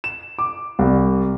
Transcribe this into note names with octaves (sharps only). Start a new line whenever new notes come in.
E7
D6
C2